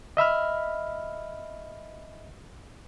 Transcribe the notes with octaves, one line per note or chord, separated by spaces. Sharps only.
D#5 E5 B5 F6